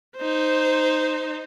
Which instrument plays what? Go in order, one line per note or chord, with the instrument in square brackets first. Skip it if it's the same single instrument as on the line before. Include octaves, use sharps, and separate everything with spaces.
[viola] D#4 C5